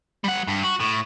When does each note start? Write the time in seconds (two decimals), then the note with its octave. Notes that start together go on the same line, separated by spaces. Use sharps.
0.24 G3 F#5
0.47 G2
0.63 F#4
0.80 A2